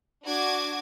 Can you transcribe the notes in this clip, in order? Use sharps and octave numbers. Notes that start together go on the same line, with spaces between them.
D4 F#4 D6 G#6